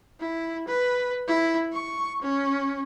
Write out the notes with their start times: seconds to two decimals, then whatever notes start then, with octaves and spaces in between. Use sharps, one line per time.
0.20 E4
0.68 B4
1.28 E4
1.73 C#6
2.22 C#4